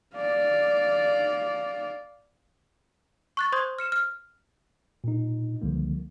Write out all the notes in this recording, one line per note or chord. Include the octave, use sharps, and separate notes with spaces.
D5 F5
C#6 F#6 A6
C5 C6 D#6 G6 G#6
F6 C#7 E7
F6
A#2 D#4
C#2 D3 D#3 F3 G3 A#3